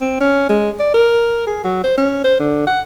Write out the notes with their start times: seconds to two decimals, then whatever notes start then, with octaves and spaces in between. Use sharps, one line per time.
0.01 C4
0.21 C#4
0.49 G#3
0.79 D5
0.94 A#4
1.47 G#4
1.64 F#3
1.84 C5
1.98 C#4
2.24 C5
2.40 D3
2.67 F#5